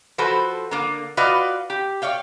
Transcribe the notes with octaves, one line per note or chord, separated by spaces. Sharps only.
F3 F#4 A4 B4 C5
D3 A#3
F4 F#4 B4 D5 D#5 F5
G4
C#5 D5 F5 G5